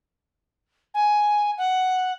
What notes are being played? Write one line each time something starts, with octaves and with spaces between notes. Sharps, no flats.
G#5
F#5